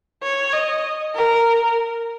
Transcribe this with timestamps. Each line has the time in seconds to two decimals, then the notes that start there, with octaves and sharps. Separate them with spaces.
0.23 C#5
0.53 D#5
1.15 A#4